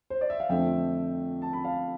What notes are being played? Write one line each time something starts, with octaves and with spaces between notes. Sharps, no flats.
C5
D5
E5
F5
F2 D3 F3 A3 C4 E5 G5
A5
B5
F5 A5